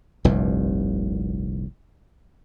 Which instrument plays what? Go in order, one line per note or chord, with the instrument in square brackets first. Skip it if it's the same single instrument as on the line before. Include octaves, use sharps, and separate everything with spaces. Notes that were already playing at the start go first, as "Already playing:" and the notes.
[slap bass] F1 C2 G2 A#2